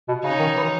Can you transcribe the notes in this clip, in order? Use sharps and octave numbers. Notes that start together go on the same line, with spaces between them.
B2
C#3 C#4 D#4
D#3
E3